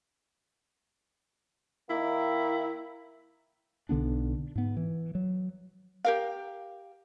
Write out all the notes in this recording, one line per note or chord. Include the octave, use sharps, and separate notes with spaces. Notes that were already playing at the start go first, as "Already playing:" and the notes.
D#3 A#3 E4
B1 D3 B3 D4
G#2 B3
E3
F#3
G4 A#4 F5